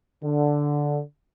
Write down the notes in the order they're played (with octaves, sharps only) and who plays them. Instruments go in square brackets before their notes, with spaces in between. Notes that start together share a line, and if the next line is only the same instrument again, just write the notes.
[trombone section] D3